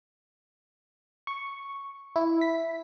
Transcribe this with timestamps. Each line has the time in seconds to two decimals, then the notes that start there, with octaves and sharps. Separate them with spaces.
1.27 C#6
2.16 E4
2.41 B6